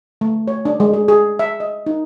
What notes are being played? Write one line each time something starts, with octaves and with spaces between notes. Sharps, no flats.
A3
C#5
D4
G#3
G#4
G#4
E5
D#5
D#4